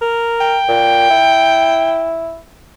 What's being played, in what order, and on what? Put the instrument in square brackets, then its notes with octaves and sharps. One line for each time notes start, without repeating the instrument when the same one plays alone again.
[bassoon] A#4
[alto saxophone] G5
[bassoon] A#2
E4